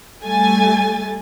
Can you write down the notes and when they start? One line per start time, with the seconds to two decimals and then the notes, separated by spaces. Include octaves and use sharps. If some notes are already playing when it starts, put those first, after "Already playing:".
0.22 G3 A3 G#5 A6